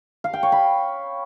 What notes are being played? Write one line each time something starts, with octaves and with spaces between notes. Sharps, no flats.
F5
G5
C#5
B5